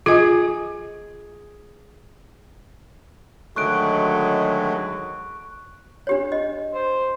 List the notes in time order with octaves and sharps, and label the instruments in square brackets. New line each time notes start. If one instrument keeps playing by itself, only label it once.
[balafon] F4 D#5 [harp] G#4
[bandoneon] D3 D#3 A3 [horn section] F#3 G#3 [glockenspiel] C#6 F#6 D7
[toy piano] D4 G4 C#5
D#5
[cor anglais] C5